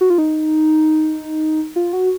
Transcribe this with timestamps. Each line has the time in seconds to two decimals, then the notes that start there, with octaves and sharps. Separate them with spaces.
0.01 F#4
0.10 F4
0.18 D#4
1.76 F4
1.93 F#4